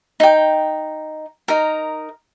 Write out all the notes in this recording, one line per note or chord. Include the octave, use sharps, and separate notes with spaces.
D#4 G5
D#4 A#4